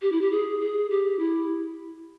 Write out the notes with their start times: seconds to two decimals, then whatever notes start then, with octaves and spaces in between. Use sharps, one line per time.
0.02 G4
0.12 E4
0.21 G4
0.32 G#4
0.61 G#4
0.90 G4
1.19 E4